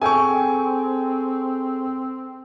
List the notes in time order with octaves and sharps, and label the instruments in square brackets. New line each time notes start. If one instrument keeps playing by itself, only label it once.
[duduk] C4 [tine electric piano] G#4 A4 G5 [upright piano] G#5 C#6